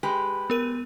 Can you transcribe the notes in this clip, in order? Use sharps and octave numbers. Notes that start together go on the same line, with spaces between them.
G#3 G4 B4
B3 A#4 D#7